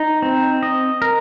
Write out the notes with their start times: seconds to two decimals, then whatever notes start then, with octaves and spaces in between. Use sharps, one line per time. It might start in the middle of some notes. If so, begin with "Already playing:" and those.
Already playing: D#4
0.22 C4
0.63 D#5
1.02 A#4